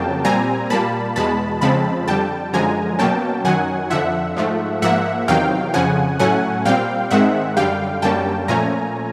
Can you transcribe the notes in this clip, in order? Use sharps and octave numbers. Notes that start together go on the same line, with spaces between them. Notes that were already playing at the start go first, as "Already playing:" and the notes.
Already playing: F2 C#3 F#3 A#3 G5 A5
A#2 G3 C4 G#5 A#5
A#2 G3 A#3 A5 B5
E2 B2 G#3 A5 B5
F2 C#3 F3 G#3 C4 A5 B5
F2 D3 G3 G5 A5
F#2 D3 F3 G#3 G#5 A#5
B2 F#3 A#3 C#4 G5 A5
F#2 D#3 F#3 F#5 G#5
F2 D3 F3 E5 F#5
G#2 F3 A3
G#2 F3 A#3 E5 F#5
E2 C3 D#3 F#3 F5 G5
F2 C#3 F3 F#5 G#5
A2 F#3 A3 C#4 F#5 G#5
A#2 G3 C4 F5 G5
G#2 D#3 G#3 C4 E5 F#5
F#2 D3 G3 F5 G5
F#2 D3 G3 A#3 C#4 G5 A5
A#2 F3 A3 C#4 G#5 A#5